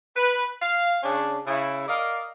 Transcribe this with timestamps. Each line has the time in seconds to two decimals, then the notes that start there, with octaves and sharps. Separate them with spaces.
0.17 B4
0.62 F5
1.03 C#3 C#4 D4
1.47 C#3 E4
1.88 A#4 D5 D#5 F5